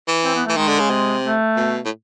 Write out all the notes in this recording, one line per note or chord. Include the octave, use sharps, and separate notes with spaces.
E3
C4
B3
E3 A3
D#3 G#3
D3
C#3
C3
A3
B2
A2